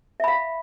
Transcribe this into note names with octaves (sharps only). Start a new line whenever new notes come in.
E5 F5 B5